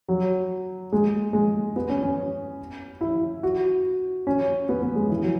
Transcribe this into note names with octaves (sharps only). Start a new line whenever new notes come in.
F#3
G#3
G#3
B3
C#4
C#4
E4
F#4
C#4
B3
B3
G#3
E3
F#3